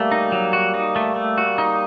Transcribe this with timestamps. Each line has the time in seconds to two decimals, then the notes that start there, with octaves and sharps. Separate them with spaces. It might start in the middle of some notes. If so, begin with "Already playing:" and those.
Already playing: G3 A3 A#3
0.12 D#4
0.32 F#3
0.53 F#4
0.74 D#4
0.96 A3
1.16 A3
1.38 F#4
1.58 D#4